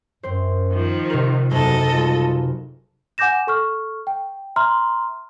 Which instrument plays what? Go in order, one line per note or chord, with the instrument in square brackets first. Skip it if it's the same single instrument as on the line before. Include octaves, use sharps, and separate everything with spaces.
[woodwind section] F#2 [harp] C4 C5
[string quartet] D#3 F3
[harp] C3 A#4
[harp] F#1 D#4 [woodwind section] E2 B2 [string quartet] A4 D#5
[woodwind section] G3 G#3 F4
[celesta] F#5 G#5 D6 G6 A#6 E7
A4 C#6 F6
G5
E5 A#5 C6 F6